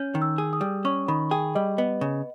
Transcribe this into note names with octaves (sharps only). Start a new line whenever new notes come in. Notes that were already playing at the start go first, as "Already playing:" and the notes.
Already playing: C#4 G6
D#3
E6
G#4
D#6
G3
C#4 C#6
D#3 B5
G#4 G5
G3 D#5
B3 D#5
C#3